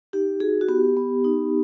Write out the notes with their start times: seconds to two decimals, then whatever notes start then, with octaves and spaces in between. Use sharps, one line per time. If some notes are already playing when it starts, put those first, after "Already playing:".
0.13 D#4 G4
0.40 F#4 G#4
0.61 F#4
0.68 B3 G4
0.97 B3
1.24 D#4